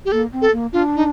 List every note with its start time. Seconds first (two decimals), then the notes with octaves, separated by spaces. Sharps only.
0.05 G4
0.12 A#3 A4
0.33 C4
0.42 A4
0.52 A#3
0.73 D4 F4
0.96 D#4